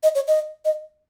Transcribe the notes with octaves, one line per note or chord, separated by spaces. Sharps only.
D#5
C#5
D#5
D#5